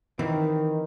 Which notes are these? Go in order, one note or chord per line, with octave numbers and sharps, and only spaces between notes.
D#3 E3 C4